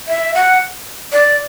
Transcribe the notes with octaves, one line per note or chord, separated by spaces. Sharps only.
E5
F#5
D5